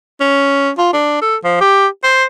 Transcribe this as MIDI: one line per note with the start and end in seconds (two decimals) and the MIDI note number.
0.21 0.70 61
0.78 0.89 65
0.93 1.18 62
1.22 1.36 69
1.44 1.59 53
1.61 1.87 67
2.03 2.24 72